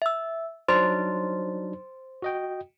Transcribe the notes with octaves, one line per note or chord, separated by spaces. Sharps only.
E5 E6
F#3 D4 D#4 C5 C6 A6
F#4 D#5 G5